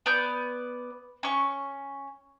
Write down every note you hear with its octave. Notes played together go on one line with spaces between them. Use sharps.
B3 D5 G6
C#4 C#6